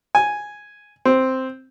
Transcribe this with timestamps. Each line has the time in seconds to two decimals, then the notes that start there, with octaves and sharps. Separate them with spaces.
0.15 G#5
1.05 C4